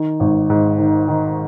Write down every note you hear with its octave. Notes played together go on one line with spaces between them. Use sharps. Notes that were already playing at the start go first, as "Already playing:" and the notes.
Already playing: D#3
G#1
G#2
D#3
D#3